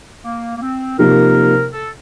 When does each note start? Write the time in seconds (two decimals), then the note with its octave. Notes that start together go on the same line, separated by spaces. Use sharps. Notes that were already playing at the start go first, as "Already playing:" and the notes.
0.24 A#3
0.57 A#3
0.61 C4
0.99 C3 F3 A#3 D#4 G4 A#4
1.73 A4